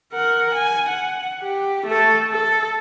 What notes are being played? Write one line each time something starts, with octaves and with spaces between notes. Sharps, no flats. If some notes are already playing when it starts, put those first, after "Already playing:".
A#4 F#5
G#5
F#5
G4
A3 A4
A4